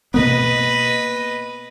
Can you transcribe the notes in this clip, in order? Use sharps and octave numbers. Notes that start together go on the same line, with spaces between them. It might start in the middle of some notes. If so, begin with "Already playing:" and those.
B2 A#3 B3 B4 D#5